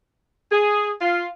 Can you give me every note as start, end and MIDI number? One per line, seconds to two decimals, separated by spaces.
0.51 0.90 68
1.01 1.27 65